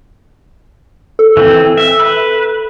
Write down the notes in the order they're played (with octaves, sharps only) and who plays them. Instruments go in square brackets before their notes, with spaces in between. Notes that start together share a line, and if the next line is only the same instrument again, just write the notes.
[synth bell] A4
[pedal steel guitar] E3 C4
E5
B4